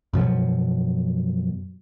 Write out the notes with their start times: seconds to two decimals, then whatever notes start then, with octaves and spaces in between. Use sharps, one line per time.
0.13 F#2 B2 F3 F#3